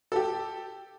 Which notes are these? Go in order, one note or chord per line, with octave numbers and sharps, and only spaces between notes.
G4 A4